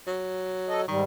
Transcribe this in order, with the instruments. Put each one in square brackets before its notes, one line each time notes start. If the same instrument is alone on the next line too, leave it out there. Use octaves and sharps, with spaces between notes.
[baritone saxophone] F#3
[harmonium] A4 D#5
[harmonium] G#2 G3 [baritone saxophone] D#3